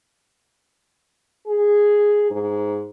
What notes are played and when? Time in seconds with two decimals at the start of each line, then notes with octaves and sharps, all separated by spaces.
1.47 G#4
2.31 G#2